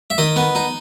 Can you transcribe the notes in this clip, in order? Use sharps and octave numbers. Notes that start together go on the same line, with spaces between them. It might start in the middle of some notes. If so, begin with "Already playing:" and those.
E5
D#3 D#5
B3
D#4